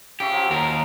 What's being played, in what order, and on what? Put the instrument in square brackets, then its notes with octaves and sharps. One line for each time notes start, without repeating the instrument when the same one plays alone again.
[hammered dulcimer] C#3 E5 C#6 [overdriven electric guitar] G4
[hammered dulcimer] F3 F#3
[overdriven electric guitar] D#2 A#4